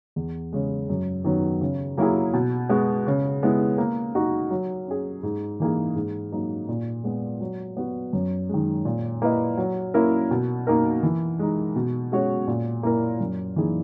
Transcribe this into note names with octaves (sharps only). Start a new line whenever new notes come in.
E2
C#3 G#3
F#2
D#3 F#3 B3
C#3
F#3 A#3 E4 G#4
B2
G#3 B3 F#4
C#3
G#3 B3 E4
A#3
D#4 F#4
F#3
C#4 G#4
G#2
E3 A#3 D#4 G#4
G#2
F#3 A#3 D#4
A#2
G#3 B3
F#3
B3 F#4
F#2
D#3 G#3
A#2
A#3 E4 B4 D#5
F#3
A#3 C#4 E4 A#4
B2
A#3 D#4 A#4
E3
G#3 D#4
B2
G#3 C#4 F#4 C#5
A#2
A#3 E4 A#4
F#2
E3 A#3 D#4 G#4